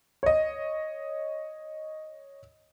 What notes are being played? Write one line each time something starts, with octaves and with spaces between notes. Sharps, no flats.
C#5 D#5